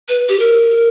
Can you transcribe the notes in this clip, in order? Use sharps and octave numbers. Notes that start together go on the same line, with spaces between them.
B4
G4
A#4